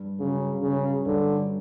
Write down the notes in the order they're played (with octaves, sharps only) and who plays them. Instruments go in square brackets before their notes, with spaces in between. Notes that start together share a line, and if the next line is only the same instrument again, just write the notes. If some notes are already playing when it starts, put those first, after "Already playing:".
Already playing: [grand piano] G2
[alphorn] C#3 [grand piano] F#3
[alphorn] C#3 [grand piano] C#4
[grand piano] G2 [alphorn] D3